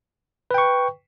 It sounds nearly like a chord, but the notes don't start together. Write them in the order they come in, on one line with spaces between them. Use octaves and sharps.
B4 G5 C#6